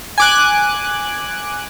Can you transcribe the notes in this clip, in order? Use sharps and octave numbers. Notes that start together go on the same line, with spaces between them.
G#5 D6 F#6